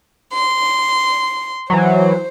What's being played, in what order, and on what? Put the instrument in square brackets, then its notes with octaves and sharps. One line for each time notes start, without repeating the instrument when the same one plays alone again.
[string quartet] C6
[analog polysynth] E3 F#3 [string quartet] C5